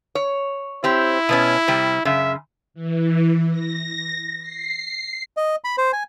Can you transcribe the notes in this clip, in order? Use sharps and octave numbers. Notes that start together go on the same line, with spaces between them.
C#5
C4 E4 G4
B2 B3 C#4
C3 G3
F#2 C#3 E5
E3
A#6
C7
D#5
B5
C5
G#5